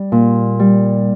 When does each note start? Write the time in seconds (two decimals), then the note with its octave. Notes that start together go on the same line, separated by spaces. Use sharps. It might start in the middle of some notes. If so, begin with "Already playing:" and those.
Already playing: G3
0.12 A#2
0.59 G3